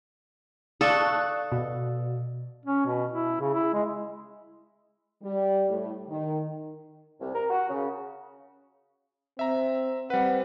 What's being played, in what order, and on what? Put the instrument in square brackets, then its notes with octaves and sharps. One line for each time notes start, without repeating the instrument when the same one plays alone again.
[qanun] A4 [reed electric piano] D5 F5 D#6 [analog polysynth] A5 C#6 F#6
[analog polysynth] B2
[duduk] C#4
B2
E4
C#3
E4
G#3
[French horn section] G3
A2
D#3
[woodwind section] C2
A#4
F#4
C#3
[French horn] C4 [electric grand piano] E5 A#5
[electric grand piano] G3 B4 [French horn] C4 [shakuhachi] F#5